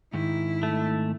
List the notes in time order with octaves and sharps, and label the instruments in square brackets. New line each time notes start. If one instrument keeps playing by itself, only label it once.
[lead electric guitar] G#2 D#3 [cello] E4
[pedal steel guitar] A3